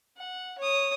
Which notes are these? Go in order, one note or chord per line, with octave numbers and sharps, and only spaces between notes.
F#5
C#5 D#6